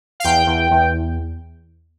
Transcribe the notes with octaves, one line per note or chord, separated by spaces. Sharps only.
F5
E2 G5
E2
E2